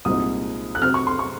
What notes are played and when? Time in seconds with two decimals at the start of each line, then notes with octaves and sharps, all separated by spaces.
0.05 C2 A#2 G#3 C4 D#4 D#6
0.75 F#6
0.81 C3 F#3 C4 F6
0.94 C#6
1.07 C6
1.19 C#6